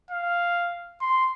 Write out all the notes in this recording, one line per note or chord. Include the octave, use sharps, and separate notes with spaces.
F5
C6